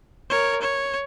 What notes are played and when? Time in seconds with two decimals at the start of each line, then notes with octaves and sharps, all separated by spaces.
0.30 A#4 C#5
0.61 C#5